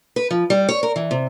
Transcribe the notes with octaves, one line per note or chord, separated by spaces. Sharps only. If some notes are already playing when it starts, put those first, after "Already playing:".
B4
F3
G3
C#5
A#4
E3
C3